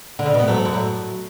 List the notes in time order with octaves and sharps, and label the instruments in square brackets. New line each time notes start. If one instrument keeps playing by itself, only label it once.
[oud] D3
C#3
B2
[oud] A2 [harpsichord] B3
[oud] G#2 [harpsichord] F#3 A3
[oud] F#2
A2